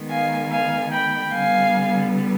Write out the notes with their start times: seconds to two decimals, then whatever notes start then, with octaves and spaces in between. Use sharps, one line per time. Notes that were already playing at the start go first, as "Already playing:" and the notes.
Already playing: D#3 G#3 B3
0.10 F5 G#5
0.51 F5 G#5
0.92 G5 B5
1.34 D3 G3 B3 F5 G#5